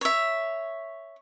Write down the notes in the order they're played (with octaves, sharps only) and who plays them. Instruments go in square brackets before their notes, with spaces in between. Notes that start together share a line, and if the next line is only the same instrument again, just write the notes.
[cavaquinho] C#5 E5